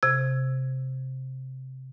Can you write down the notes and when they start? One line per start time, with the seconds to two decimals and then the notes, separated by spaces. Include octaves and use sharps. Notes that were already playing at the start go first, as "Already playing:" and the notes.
0.03 C3 G#6